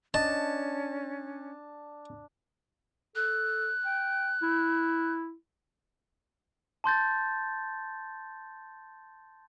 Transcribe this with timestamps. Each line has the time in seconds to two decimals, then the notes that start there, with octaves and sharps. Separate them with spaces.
0.14 C#4 D4 D#5 A5
3.16 A4 F#6
3.85 G5
4.42 E4
6.84 A5 C6 G6 A6